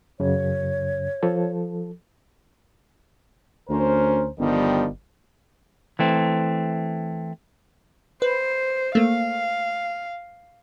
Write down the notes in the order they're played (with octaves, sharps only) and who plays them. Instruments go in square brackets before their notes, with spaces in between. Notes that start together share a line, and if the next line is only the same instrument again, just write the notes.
[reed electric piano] F#2 C#3 [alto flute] C#5
[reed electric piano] F3 A4
[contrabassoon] D2 [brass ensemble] C#4 A#4 C5
[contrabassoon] G1 [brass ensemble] D#3 F3 G3
[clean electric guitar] E3 A3 C4
[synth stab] B4 [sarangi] C5
[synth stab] A3 A#3 [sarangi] F5